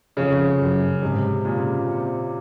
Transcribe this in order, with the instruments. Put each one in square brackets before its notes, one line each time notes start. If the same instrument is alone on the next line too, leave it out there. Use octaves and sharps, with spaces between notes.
[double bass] F2 [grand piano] C#3
[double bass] F#2
[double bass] G#2 [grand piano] C3
[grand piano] A#2 [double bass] C#3
[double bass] C3